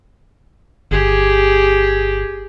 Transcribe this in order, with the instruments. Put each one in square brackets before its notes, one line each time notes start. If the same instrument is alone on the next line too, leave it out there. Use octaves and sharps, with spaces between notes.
[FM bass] G1 [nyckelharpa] G4 G#4